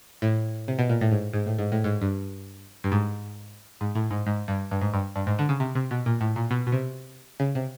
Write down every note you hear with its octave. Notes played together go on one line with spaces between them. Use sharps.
A2
C3
B2
A#2
A2
G#2
G#2
A2
G#2
A2
G#2
G2
G2
G#2
G#2
A2
G#2
G#2
G2
G2
G#2
G2
G2
G#2
D3
C#3
C3
C3
B2
A#2
A2
A#2
B2
B2
C3
C#3
C3